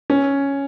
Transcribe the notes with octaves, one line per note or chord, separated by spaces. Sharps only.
C#4